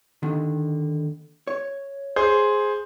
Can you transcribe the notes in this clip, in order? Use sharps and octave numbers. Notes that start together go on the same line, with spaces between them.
D#2 D3 D#3
C#5
G#4 C5